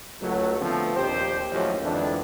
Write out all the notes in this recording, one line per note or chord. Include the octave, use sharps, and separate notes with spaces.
C#2 F#3 A3
D3 F3 A3 B3 C4
A#1 D#2 G4 C5
D#2 A2 F3 F#3 A#3 C#4
G#1 F2 D3 E3 D4